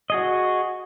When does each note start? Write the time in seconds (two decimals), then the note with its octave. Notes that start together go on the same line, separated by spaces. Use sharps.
0.10 F#4 G#4 D#5